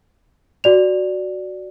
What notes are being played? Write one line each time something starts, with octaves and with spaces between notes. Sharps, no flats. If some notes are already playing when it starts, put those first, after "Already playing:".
F#4 D5 F7